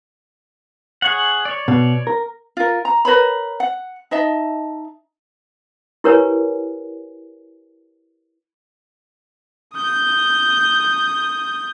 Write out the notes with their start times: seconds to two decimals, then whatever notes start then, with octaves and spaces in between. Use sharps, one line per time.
1.02 G#4 C#5 F#5
1.45 C#5 D5
1.68 B2
2.07 A#4
2.57 F4 A#4
2.85 A#5
3.05 A#4 B4 C#5 B5
3.60 F#5
4.11 D#4 D#5 E5 A5
6.04 E4 G4 A#4 B4 C#5 G#5
9.74 D#6 G6